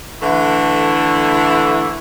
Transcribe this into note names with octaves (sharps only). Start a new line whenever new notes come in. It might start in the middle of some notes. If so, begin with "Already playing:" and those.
D3 E3 A3 E4